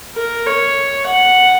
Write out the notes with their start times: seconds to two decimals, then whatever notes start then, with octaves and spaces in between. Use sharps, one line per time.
0.16 A#4
0.46 C#5
1.07 F#5